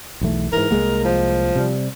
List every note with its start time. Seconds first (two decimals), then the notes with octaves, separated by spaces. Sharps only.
0.21 B1 E2 A3
0.53 G#2 E3 A#4
0.71 C2 G#3 A#3
1.05 F3
1.56 C3 G3